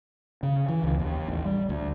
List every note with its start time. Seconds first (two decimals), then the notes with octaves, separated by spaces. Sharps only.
0.43 C#3
0.68 E3
0.84 C#2
0.99 D#2
1.28 A1
1.45 G3
1.69 D2